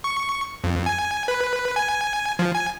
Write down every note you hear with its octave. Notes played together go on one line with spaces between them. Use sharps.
C#6
F2
G#5
B4
G#5
F3
G#5